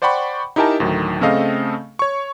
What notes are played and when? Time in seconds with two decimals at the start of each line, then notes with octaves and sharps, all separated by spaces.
0.02 C5 D5 F#5 G5 B5 C#6
0.56 D#4 E4 G4 A#4 G#5 A5
0.80 D2 A2 D#3 F#3
1.21 C#3 A3 C4 A4 D#5 F5
1.99 C#5 C#6